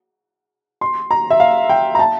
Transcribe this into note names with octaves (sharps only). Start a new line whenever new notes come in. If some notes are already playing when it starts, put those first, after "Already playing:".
C6
A#5
E5
F5
G5
A#5
A5